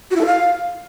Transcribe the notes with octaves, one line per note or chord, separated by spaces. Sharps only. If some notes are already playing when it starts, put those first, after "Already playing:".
F#4
E4
A4
F5